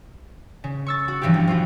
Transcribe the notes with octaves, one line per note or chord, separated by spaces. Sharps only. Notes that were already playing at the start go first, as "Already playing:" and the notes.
C#3
C#6 E6 A6
F#4
G2 E3 F3 B3 G4
B1
F3 F4 F#4